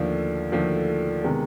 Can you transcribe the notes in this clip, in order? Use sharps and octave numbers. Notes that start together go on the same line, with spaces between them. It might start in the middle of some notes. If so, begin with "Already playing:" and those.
Already playing: D#2 D3 F3 A3 D4
D#2 D3 F3 A3 D4
C3 D#3 G#3 B3